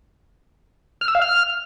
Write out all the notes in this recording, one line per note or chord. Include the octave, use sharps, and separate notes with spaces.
F6
E6
F5
F6